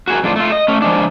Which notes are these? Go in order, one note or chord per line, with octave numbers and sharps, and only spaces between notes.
F#4 G#4 A#4
F2 A2 D4 F4
A3 F4
D#5
A3 C#4
F3 G#3 D4